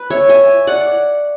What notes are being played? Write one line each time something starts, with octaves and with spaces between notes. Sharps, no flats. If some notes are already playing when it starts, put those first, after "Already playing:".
Already playing: B4
C#5 E5
E5 G#5
D5 F#5